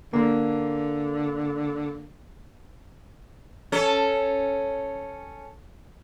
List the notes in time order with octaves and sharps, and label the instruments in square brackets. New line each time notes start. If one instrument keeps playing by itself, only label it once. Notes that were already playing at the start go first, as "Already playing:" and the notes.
[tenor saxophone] D3 [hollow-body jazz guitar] A#3
[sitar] C#4 A4